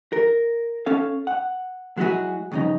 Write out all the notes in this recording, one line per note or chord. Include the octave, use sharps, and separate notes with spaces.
A#4
C#4 A4 F5
F#5
F#3 G#3 B3 E4 F#4 G#4
C#2 G2 C#3 F3 D#4